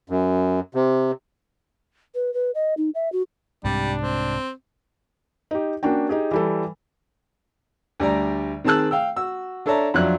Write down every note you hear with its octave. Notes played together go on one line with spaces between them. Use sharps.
F#2
C3
B4
B4
D#5
D#4
E5
F#4
C2 G#2 C3 G3 D4
C4
D#4 G4
A#3 C#4 D4 F#4 G5
D#4 G4 G#4
E3 G3 A4
D2 G3 D5 A#5
D#3 C4 G#4 A5 E6 F#6
F5 G5 E6
F#4 E6
D4 A4 C#5 E5 A5 A#5
F2 F#3 D4 E5 F#6